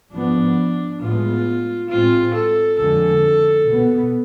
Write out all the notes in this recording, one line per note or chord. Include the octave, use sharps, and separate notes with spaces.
G#2 F3 B3 D4
A2 G#3 B3 F4
A2 G#3 C4 F4
A4
F2 D3 G#3 A4
B2 B3